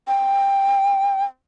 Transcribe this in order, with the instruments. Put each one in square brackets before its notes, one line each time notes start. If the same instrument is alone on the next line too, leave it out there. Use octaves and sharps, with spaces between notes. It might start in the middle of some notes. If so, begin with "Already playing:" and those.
[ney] G5